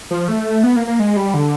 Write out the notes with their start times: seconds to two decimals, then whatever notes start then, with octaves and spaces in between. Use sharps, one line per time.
0.11 F3
0.28 A3
0.64 B3
0.76 A#3
0.87 A#3
0.99 G#3
1.17 G3
1.34 D3